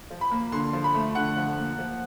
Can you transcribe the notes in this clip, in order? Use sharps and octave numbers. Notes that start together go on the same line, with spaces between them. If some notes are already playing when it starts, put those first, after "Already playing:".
F3
B5
A#3
D3 C6
F3
B5
A3
D3 F#5
F3
A#3
F3